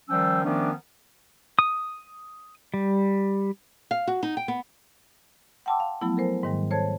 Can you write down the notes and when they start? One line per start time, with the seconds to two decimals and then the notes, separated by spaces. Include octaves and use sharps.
0.09 D#3 F3 G3 C#4 G5 E6
0.44 D#3 F3 A3 B3 C#4 D4
1.59 D#6
2.74 G3
3.91 F5
4.07 F#4
4.23 D#4
4.37 G5
4.48 B3
5.66 F#5 G5 A5 C6 D6 E6
5.80 F5
6.01 F3 F#3 A3 B3 E4
6.17 A4 A#4 C5 G#5
6.43 G#2 D#3 G3
6.71 A4 C5 C#5 A5 G#6